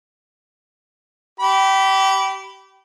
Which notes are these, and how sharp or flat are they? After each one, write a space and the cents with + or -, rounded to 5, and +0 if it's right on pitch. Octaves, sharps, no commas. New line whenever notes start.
G4 -25 B5 +0